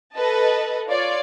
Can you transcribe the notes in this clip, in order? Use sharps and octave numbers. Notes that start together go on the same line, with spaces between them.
A4 B4 D#5 A5
F4 C#5 D5